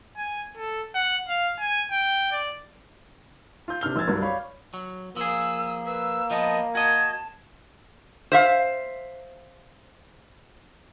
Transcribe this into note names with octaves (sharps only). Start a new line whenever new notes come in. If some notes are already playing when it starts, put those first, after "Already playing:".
G#5
A4
F#5
F5
G#5
G5
D5
F4 G6
C3 D4 F6 G7
A#1 E6 F6 G#6 A6
C2 G2 F#3
C#5 D5 F5 B5
F#3
F3 A#3 G#4 E6
B4 E6
F3 B3 D#5 A5
F#4 D#5 A5 G#6
C5 E5 F5